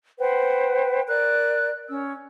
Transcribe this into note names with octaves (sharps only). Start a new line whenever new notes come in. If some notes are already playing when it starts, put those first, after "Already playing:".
B4 C5 F#5 G5
A#4 D5 F#6
C#4 E6